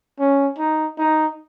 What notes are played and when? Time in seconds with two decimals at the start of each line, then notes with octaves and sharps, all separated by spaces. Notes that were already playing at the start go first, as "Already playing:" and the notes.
0.19 C#4
0.58 D#4
0.98 D#4